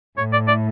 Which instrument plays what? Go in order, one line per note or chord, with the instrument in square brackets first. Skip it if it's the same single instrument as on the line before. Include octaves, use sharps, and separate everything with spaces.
[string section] A2 [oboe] C#5
[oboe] D5
D5